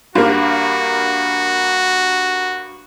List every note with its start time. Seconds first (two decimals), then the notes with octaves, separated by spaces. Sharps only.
0.15 G2 A#3 F#4